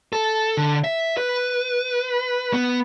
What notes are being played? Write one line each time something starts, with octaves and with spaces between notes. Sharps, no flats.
A4
D3
E5
B4
B3